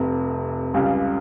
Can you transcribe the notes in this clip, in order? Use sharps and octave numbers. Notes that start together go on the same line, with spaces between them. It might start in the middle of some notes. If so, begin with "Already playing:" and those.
Already playing: F1 F2 C3
C#2 C#3 G3